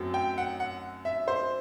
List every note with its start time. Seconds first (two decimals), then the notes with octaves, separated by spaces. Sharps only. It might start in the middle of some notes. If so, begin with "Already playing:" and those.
Already playing: F#2 F#3 A3 C4
0.14 G5
0.38 F#5
0.60 F#5
1.05 E5
1.28 C5